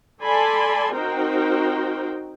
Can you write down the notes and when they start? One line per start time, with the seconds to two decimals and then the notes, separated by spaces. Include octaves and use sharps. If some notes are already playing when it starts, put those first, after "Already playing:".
0.21 A4 D5 G#5 A5 B5 C6
0.95 C4 D#4 F#4 A#4 C5 G5